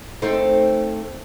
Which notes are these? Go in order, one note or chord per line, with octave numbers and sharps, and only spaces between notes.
A3 C4 D#4